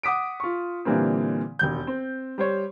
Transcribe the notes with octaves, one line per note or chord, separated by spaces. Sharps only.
F#5 D6 D#6 B6 D7
F4 C#6
A#2 D3 E3 G3 A#3 C4
E1 D#2 G6
C4
G3 C5 C#5